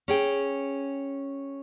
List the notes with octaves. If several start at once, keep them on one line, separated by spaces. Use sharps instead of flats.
C#4 G#4 G5